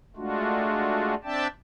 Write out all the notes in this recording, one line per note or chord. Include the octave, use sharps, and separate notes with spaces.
G#3 A3 D4 F4 F#4
C4 D4 D5 E5 G5 A5